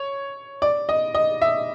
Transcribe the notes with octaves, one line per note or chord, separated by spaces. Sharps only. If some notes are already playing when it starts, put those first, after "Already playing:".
Already playing: C#5
D5
D#5
D#5
E5